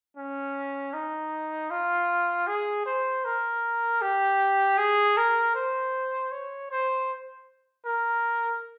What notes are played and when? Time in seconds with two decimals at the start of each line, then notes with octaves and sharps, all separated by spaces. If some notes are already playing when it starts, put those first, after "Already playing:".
0.17 C#4
0.93 D#4
1.70 F4
2.47 G#4
2.86 C5
3.25 A#4
4.02 G4
4.78 G#4
5.17 A#4
5.55 C5
6.32 C#5
6.71 C5
7.86 A#4